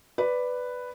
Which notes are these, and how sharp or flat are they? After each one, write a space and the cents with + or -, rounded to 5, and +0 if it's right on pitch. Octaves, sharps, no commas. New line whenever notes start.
B4 +5 D5 +0